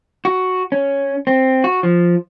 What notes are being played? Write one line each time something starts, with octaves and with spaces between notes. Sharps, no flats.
F#4
C#4
C4
F#4
F3